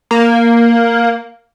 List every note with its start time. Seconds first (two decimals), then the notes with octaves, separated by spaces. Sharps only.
0.11 A#3